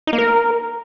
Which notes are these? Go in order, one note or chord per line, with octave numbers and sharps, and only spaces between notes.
D#4
A#3
A#4